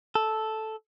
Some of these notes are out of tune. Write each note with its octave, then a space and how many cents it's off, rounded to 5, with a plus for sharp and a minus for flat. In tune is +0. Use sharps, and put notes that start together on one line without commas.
A4 -5